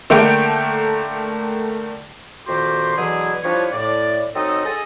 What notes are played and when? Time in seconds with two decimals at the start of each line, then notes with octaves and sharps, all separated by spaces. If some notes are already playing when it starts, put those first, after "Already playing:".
0.10 D3 A3 A#3 G5 D7
2.47 F2 A#2 D#3 F#4 G4 C6
2.97 B2 D3 E3 F#3 E4 G#4
3.43 F3 G3 D4 E4 B4 C#5
3.72 A2 D5
4.34 F#3 C4 D#4 A4 D#5
4.65 G#4 A4 D#5